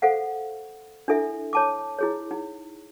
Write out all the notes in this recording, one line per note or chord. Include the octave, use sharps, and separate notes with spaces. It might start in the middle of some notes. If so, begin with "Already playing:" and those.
A4 C5 F5 F#5
D4 E4 A4 E5
C#5 A5 D6
E4 G#4 C#5
D#4